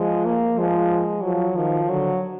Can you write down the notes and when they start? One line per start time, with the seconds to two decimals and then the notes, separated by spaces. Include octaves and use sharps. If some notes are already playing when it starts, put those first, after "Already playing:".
Already playing: F3 G#3
0.25 A#3
0.57 F3 G#3
1.23 F3 F#3
1.56 D#3 F3
1.89 D3 F#3